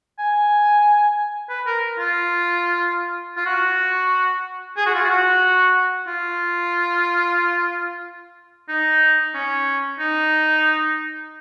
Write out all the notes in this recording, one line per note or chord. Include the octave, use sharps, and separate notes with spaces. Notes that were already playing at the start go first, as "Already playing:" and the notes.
G#5
B4
A#4
F4
F4
F#4
G#4
F#4
F4
F#4
F4
D#4
C#4
D#4